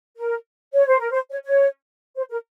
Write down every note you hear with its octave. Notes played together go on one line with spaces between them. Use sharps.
A#4
C#5
C5
A#4
C5
C#5
C#5
C5
A#4